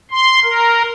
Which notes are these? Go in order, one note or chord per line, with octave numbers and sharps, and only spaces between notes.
C6
A#4